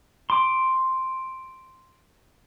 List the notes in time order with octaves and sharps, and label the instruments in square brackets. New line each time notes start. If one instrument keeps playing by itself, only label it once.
[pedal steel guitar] C6 D6